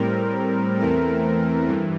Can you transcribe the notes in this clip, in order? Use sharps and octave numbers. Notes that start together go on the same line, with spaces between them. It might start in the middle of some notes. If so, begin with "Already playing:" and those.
Already playing: A2 G3 C4 A#4
E2 E3 A3 C4 A#4
G2 E3